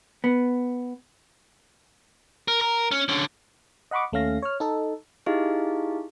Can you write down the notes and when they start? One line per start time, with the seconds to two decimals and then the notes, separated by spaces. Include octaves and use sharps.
0.24 B3
2.48 A#4
2.61 A#4
2.91 C#4
3.09 D3 C#4
3.91 D#5 F#5 B5 C#6 D6
4.12 D#2 A3 C#4 F5 A#6
4.42 C#5 F6
4.60 D#4 A4
5.26 D#4 E4 G4 G#4 D#5 F5